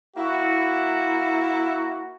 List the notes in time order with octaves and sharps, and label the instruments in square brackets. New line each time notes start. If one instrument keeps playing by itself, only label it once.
[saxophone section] A#3 E4 [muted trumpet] F#4